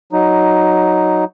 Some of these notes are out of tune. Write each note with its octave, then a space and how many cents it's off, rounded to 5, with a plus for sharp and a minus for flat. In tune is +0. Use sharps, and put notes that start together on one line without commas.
F#3 +0 D#4 +0